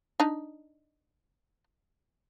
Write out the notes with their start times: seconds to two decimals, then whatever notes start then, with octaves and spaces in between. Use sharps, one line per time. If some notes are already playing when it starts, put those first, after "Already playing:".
0.20 D4 D#4